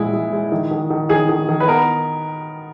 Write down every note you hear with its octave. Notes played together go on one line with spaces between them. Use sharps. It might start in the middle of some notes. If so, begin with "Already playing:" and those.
Already playing: A#2 G#3 E4
G#3
G#3
D#3
D#3
D#3
D#3 G#4
D#3
D#3
B4
B3 A#4